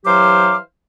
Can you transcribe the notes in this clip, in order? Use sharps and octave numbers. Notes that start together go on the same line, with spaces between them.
E3 F#3 G4 C5 F5 D6